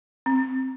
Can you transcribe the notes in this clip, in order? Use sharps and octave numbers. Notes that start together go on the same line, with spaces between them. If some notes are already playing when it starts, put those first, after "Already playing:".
C4